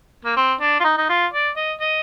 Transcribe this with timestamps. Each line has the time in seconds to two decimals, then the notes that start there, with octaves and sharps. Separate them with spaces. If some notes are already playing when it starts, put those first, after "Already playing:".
0.25 A#3
0.37 C4
0.61 D4
0.80 F4
0.84 D#4
0.97 D#4
1.09 F4
1.33 D5
1.56 D#5
1.81 D#5